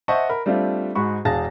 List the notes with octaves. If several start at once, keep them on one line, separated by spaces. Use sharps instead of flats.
C5 D#5 E5 F#5 A5 C#6
A#4 B5
G3 A3 C4 D4 F4
G#2 G#3 F#4 B5 C#6
E1 G#4 F5 A5 A6 A#6